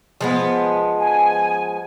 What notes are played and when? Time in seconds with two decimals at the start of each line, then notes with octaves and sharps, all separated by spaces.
0.21 F3 G#3 B3
0.99 G#5